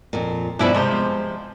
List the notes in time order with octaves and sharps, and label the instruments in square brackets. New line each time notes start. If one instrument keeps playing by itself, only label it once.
[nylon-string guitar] F2 A#2
[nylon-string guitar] G2 B2 F3 [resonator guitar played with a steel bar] D4 E4 B4
[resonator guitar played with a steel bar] C3 F3 C5 [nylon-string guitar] G#3